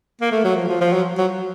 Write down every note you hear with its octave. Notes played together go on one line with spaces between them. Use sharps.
A#3
A3
F#3
F3
F3
F3
F#3
F#3